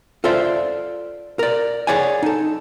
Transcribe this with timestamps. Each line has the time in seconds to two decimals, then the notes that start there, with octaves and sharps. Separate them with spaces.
0.24 F4 A4 C5 D5 E5
1.39 A#4 D5
1.87 G#4 C#5 D5 F#5 G#5
2.23 D#4 A4